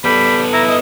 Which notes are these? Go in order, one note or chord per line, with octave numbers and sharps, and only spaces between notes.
G3 B3 A4 B5
E4 A#5
D#5